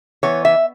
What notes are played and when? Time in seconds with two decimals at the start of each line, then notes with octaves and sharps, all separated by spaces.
0.23 E3 B3 C#5
0.45 E5